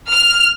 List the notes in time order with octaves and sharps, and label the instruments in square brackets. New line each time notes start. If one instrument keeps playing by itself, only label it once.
[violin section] F6